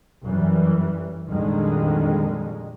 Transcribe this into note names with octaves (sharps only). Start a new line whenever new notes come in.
F#2 E3 G3
A#1 F2 D3 D#3 G3 G#3